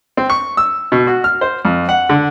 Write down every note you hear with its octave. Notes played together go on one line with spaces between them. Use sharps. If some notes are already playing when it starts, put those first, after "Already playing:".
C4
C#6
E6
B2
F#4
F6
C5
F2
F#5
D3